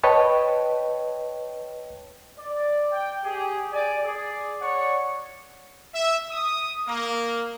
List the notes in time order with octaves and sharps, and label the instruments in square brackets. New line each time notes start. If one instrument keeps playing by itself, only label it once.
[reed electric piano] B4 C#5 D#5 G5 A5
[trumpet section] D5
G5
G4 G#4
D5 G#5
G#4 D5
C#5 D5 F#5 C#6
E5
D#6
A#3